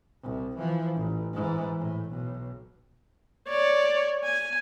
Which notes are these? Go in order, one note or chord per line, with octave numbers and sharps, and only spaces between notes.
C2
E3 F3
A1
G#2 E3
A2
B1
C#5 D5
G#5